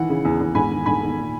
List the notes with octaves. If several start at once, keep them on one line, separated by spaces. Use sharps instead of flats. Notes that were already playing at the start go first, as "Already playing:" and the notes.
Already playing: D#3 E3 F#5
C#3
E2
E2
G#2 G#5 B5
D#3
G#2 G#5 B5
D#3
A#2